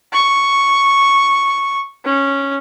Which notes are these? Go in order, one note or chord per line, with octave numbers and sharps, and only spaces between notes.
C#6
C#4